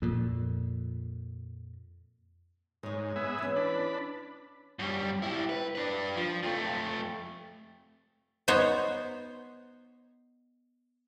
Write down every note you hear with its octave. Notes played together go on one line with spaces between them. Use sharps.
F2 A#2
G#2 G#3 C#5
B3 G#4 E5
E3 C#4
D4 B5
F#2 G3
E4 G4
B4
D4 B4
F3
F2 A3
B3 D#4 C5 C#5